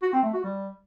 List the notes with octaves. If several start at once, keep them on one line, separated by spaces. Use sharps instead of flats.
F#4
C4
A3
F#4
G3